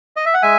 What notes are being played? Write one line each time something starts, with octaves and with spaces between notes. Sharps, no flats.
D#5
E5
F#5
G#3 E5 G#5